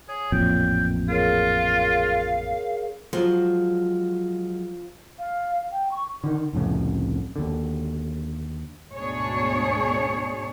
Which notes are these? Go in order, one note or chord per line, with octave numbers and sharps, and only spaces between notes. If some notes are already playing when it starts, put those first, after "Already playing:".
G#4 C#5
A1 F2 A#2 G5
F4 G#4 A#4 C#5 F5
F3 F#3 G#3
F5
G5
C#6
D3 D#3
C2 F2 A2 C#3
D#2 D3
D2 G#2 B2 D4 G#4 C#5